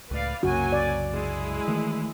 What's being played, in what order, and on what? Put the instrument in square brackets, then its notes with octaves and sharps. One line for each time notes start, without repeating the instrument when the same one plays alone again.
[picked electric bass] C#2 A2 [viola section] B4 D5 F5
[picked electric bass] C2 F#2 C#3 [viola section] F#3 A#3 G#5 [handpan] F#4
[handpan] D5
[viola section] G#3 E4
[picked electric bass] D#3 E3 A3